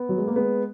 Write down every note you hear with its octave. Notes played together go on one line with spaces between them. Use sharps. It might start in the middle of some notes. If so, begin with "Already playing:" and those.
Already playing: B3
F#3
G#3
A#3
G#3 B3